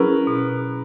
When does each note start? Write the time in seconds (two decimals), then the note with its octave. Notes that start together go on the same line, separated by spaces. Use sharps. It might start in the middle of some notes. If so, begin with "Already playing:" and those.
Already playing: F#3 C#4 E4 G#4 A#4 B4
0.27 B2